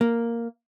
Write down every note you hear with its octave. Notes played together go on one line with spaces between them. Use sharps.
A#3